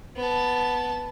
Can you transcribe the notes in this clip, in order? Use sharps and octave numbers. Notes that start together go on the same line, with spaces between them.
B3 A5